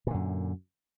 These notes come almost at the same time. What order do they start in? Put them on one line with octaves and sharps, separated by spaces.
A#2 D3 F#2